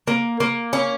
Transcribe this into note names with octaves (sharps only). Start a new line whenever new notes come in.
A#3
A#3
C#4